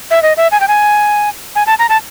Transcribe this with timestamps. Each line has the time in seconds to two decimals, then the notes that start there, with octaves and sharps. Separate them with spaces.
0.11 E5
0.23 D#5
0.37 E5
0.52 G#5
0.60 G5
0.68 G#5
1.56 G#5
1.67 A5
1.79 A#5
1.89 A5